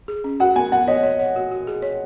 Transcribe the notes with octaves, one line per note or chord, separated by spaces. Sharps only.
G#4
C#4
F#4 F#5
B3 G#5
B3 F#5
C#5 D#5
C#5
C#5
F#4
F#4
G#4
C#5